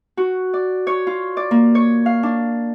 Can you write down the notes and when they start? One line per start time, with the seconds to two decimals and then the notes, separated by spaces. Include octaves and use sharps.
0.17 F#4
0.54 D5
0.87 C#5
1.07 F4
1.37 D5
1.51 A#3
1.75 C#5
2.06 F5
2.23 D4